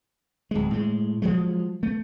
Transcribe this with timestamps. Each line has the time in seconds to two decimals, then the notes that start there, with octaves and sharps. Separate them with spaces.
0.51 D1 G#3
0.71 A2 G#3
1.22 F3 F#3 G#3
1.83 A3